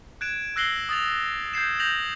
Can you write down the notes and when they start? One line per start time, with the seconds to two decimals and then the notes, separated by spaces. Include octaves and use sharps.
0.21 F#6 G#6 D7 E7
0.56 E6 F#6 A#6 C7 F#7 G7
0.89 D#6 A6 F7
1.53 G6 G#6 C7 E7
1.80 G6 A#6 F7 F#7